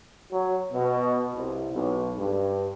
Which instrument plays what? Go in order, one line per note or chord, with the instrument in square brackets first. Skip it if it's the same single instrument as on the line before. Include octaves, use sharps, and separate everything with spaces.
[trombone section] F#3
B2
C2
B1
G2